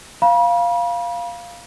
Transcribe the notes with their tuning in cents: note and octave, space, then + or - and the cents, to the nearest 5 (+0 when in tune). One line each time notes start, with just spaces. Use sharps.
F5 +0 B5 -40